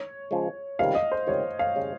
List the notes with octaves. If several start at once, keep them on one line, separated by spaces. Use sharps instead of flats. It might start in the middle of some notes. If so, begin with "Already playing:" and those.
Already playing: C#5
C#3 F3 G#3
C#2 C3 D#3 G3 F5
D#5
C5
C#2 C3 D#3 G3 C#5
F5
C#3 G3 C#4